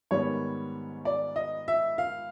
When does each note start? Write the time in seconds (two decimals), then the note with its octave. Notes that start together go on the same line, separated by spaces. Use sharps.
0.11 G#2 D#3 G3 B3 C#5
1.05 D5
1.36 D#5
1.68 E5
1.98 F5